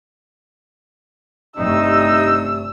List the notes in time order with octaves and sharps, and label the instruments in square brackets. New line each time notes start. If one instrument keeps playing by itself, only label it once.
[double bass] G1 A3 [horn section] C3 [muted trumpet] D#4 [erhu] E6